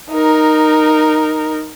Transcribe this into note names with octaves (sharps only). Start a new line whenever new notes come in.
D#4 A#4